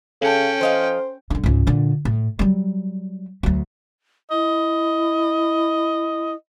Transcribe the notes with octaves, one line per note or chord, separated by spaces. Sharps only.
C#3 C#4 A4 C#5 G5 A5
F3 C5 D#5 F5
F#2 D3
C#2 G#2
A#2 D3
A2
F#3 G3
D2 F#3
E4 D#5